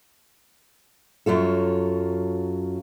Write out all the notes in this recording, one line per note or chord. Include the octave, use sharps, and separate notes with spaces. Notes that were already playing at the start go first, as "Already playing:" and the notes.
F#2 F#3 F4 A4